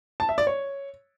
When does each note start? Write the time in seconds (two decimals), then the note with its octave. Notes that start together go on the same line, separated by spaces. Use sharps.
0.20 A5
0.29 E5
0.38 D5
0.47 C#5